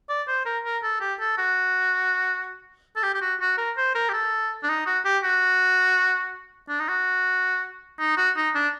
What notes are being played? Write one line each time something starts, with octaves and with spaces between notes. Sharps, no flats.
D5
C5
A#4
A#4
A4
G4
A4
F#4
A4
G4
G4
F#4
F#4
A#4
C5
A#4
G4
A4
D4
D#4
F#4
G4
F#4
D4
D#4
F#4
D#4
F#4
D#4
D4